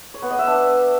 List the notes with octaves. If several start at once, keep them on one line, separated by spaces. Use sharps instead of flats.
C#5
B3
D#5
E5
D4